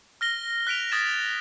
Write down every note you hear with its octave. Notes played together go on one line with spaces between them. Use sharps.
F6 A#6 G7
F#6 B6 D7 F7
D#6 G#6 A6 E7